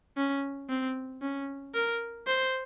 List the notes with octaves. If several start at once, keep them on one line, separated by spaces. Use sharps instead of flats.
C#4
C4
C#4
A#4
C5